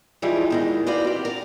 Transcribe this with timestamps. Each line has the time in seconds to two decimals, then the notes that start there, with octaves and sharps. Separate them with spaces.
0.22 G#2 E3 F3 G3 G#3 F4
0.50 E2 D#3 G#3
0.87 F#4 B4 C5 D5 F5
1.04 C4 G4
1.25 A#4 D5